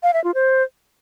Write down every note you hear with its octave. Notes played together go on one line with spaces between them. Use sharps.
F5
E5
F4
C5